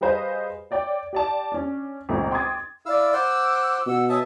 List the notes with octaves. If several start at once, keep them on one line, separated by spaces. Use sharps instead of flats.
G3 G#4 B4 C5 D#5 F5
C#5 D5 G5
G4 D5 A5
C#4 D4
G#1 C#2 A#2 C#3 A3 A#5
G5 C6 D6 D#6 G#6 A6
E4 D5 F5 E6
C5 F#5 D6 E6
B2 F#5 E6
C#5 E5 G#5 A5 D#6